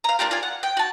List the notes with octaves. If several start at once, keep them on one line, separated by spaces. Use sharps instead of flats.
F5 A#5
A#3 D4 F4 G4
F4 D5 G#5
F#5
G5
F#4 A5